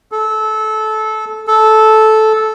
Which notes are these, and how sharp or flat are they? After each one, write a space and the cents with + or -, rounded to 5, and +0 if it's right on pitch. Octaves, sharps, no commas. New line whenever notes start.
A4 -20
A4 -10